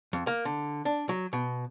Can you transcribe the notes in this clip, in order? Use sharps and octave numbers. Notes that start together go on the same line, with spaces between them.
F2
A#3
D3
D4
F#3
B2